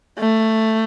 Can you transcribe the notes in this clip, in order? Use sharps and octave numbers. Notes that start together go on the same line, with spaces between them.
A3